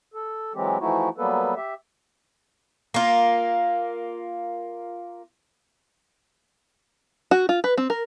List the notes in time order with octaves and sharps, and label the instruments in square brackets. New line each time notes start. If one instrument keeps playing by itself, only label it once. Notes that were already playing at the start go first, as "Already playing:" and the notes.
[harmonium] A4
E3 F#3 G#3 C4 G4
E3 F3 A3 D#4 E4 F#4
F#3 G3 A#3 B3 A4 B4
G4 E5
[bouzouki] A#3 F4
[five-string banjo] F#4
F4
B4
C4
A#4